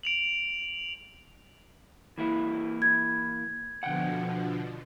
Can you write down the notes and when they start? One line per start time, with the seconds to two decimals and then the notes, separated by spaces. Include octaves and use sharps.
0.03 D7 F7 F#7
2.18 E3 A#3 E4
2.82 G#6
3.83 B2 D3 F3 F#5 G5